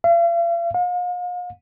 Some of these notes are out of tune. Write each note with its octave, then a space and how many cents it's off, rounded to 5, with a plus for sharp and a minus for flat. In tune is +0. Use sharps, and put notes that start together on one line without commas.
F5 -45
F5 +40